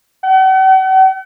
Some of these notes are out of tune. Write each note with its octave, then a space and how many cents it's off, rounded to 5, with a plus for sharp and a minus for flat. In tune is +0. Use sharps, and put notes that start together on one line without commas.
F#5 +45